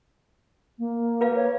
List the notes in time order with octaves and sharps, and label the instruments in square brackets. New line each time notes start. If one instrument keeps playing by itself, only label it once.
[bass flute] A#3
[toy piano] B4 F5
[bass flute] C#5